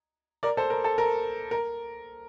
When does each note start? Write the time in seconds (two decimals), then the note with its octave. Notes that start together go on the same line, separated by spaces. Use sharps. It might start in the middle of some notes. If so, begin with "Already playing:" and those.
0.43 A#4 D5
0.57 A4 C5
0.70 A#4
0.84 A4
0.98 A#4
1.51 A#4